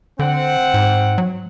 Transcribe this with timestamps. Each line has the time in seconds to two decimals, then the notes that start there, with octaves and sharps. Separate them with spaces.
0.19 D3 C4 F#5
0.74 G#2
1.18 F#3